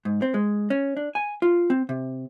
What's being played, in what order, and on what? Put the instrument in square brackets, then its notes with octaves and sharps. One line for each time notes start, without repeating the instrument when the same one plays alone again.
[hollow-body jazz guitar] G#2
C4
G#3
C#4
D4
G#5
F4
C4
C3